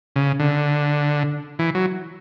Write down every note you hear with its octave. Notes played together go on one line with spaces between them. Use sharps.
C#3
D3
E3
F#3